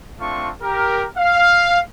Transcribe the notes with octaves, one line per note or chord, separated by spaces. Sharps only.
A3 C4 D4 F4 C#6
G4 A#4
F5